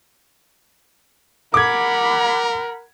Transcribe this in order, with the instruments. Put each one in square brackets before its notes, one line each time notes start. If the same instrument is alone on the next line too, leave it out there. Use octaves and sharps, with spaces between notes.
[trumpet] A#4 [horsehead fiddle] F#5 B5 [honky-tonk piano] D6 G#6